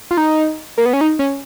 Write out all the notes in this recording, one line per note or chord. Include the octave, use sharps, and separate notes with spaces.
F4
D#4
A#3
B3
C#4
D#4
C#4